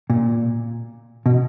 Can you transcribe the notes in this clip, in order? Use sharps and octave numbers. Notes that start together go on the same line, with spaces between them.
A#2
B2